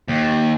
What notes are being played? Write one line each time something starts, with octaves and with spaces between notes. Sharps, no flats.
D#2